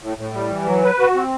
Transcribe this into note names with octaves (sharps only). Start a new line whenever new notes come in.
A2
A2
G3
E3
F#3
B4
F#4
C4